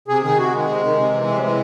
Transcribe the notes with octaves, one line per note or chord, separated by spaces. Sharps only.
C3 G#4
D#3 G#4
C3 F#4
D#3 G#3
C3
D#3
C3
E3
C3
F#3
E3 G#3